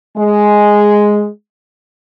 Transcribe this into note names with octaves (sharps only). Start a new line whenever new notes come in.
G#3